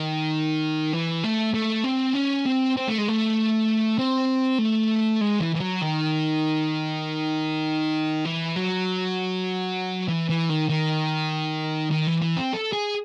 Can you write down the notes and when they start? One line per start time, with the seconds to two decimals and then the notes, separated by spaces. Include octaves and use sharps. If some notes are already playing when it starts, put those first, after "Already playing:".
Already playing: D#3
0.93 E3
1.24 A3
1.54 A3
1.84 C4
2.15 C#4
2.46 C4
2.77 C4
2.88 A3
2.98 G#3
3.09 A3
3.99 C4
4.59 A3
5.21 G#3
5.41 E3
5.55 E3
5.60 F#3
5.82 D#3
8.25 E3
8.56 F#3
10.08 E3
10.29 E3
10.49 D#3
10.69 D#3
11.91 D#3
12.07 E3
12.21 E3
12.36 C4
12.53 A4
12.72 G#4